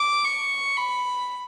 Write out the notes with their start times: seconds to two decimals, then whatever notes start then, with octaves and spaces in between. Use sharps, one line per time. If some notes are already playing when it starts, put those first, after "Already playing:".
Already playing: D6
0.24 C#6
0.77 B5